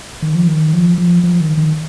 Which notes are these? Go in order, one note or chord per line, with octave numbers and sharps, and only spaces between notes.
D#3
F3
D#3
F3
F3
F3
D#3
D#3